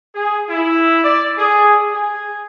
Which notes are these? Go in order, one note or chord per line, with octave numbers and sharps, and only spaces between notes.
G#4
E4
D5
G#4
G#4